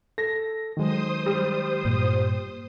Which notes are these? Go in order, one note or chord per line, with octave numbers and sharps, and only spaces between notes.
A4 A#6
D#3 F#3 G#3 C5 D#6
G3
G2 A#2